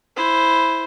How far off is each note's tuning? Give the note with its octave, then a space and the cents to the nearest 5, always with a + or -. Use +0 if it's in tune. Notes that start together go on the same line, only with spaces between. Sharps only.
E4 +0 C5 +0